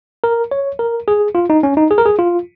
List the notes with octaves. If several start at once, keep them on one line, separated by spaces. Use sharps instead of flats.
A#4
C#5
A#4
G#4
F4
D#4
C#4
D#4
G#4
A#4
G#4
F4